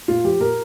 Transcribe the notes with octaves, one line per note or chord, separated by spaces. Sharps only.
A#2 F4
F3 G4
A#2 A#4